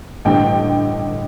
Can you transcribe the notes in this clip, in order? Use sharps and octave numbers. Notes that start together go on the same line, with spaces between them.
A1 G2 D3 G5